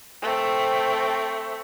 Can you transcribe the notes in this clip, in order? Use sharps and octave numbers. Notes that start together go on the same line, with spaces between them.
A3 C4